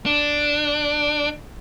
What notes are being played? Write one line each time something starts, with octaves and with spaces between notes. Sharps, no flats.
D4